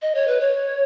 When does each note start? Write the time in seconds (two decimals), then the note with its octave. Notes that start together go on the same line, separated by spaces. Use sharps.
0.02 D#5
0.15 C#5
0.27 B4
0.40 C#5